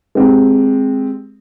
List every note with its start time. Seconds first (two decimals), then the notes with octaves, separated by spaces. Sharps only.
0.15 G#3 C4 G4